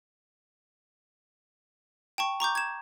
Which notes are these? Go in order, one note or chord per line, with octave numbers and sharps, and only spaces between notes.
G5 A5 C#6
A#5 C#6 D6 G6
G#6 E7